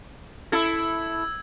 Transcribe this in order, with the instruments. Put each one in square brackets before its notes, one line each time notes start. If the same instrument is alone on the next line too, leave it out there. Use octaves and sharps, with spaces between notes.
[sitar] E4 A4 [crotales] E6 G#6